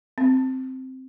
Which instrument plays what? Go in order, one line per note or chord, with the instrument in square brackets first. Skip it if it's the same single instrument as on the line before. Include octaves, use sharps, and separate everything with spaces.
[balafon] C4